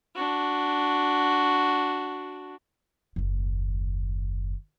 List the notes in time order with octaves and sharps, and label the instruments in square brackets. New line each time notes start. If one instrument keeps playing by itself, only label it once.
[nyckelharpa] D4 F#4
[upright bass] F#1 D#2